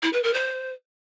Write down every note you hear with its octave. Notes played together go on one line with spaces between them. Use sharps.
E4
B4
A#4
C5